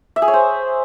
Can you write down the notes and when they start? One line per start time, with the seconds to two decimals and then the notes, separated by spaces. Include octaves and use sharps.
0.16 E5
0.22 G#4
0.28 C#5
0.34 C5